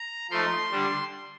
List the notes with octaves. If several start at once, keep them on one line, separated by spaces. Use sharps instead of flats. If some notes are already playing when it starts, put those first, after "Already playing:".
Already playing: A#5
F3 A3 D#4 C6
D3 G3 D4